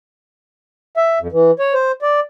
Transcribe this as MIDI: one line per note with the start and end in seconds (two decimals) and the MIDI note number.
0.97 1.19 76
1.21 1.28 41
1.32 1.51 52
1.59 1.74 73
1.74 1.92 72
2.02 2.20 74